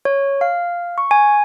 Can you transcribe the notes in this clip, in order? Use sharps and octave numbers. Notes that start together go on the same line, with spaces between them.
C#5
F5
C#6
G#5